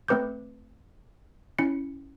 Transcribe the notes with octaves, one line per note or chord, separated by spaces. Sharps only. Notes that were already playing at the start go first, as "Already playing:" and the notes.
A3 C4 B4 D6 G6
C#4 E4 C#7